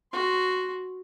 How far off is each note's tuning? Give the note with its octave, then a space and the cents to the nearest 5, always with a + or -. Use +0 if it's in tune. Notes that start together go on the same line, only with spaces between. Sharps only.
F#4 +0 C6 +0